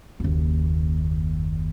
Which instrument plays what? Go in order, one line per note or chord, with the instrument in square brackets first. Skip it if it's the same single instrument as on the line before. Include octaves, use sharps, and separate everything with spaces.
[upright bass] F#1 D#2